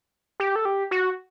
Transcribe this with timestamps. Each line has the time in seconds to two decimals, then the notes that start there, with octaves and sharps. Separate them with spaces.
0.40 G4
0.56 A4
0.65 G4
0.91 F#4